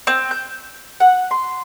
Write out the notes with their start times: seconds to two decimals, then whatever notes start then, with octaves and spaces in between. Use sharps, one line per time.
0.07 C4
0.31 G6
1.00 F#5
1.31 C6